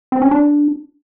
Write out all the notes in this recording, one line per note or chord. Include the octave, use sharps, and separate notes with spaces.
C4
C#4
D4